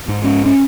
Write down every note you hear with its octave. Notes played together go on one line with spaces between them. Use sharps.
G#2
C#4
C#4